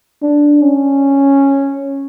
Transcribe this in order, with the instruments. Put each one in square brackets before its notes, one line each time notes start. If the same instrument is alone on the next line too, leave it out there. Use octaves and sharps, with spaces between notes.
[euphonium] D4
C#4